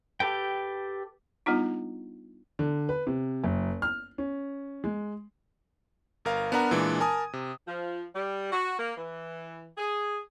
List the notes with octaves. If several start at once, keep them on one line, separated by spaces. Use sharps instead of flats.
G4 A4 B4 G5
G3 B3 D4 D#4 F4
D3
B4
C3
F#1
F6
C#4
G#3
G1 A#4 F5
B3 D4 A#4 B4 F#5 A#5
A#2 E3 G#3 D4 G#6
A#4 G#5 A5 D#6
C3
F3
G3
F#4
A#3
E3
G#4